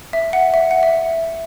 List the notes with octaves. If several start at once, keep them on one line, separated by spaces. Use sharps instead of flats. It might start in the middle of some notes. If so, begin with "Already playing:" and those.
E5
F#5
E5
F#5
E5